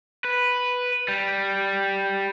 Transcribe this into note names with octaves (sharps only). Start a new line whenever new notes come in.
B4
G3